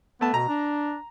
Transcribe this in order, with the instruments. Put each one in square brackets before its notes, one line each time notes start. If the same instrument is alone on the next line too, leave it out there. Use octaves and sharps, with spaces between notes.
[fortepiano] A3 A5 [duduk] B3
[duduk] B2 [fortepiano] A#5
[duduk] D4